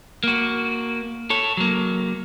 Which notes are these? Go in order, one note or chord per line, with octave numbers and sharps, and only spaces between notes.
A#3 F#4
A4 C#5
F#3 A#3